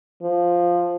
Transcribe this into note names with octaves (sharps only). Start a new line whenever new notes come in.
F3